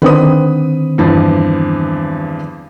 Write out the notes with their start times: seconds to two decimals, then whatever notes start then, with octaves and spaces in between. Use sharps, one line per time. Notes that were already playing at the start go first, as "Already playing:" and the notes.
0.02 D3 D#3 C4 B4 D#6
0.98 E2 G2 F3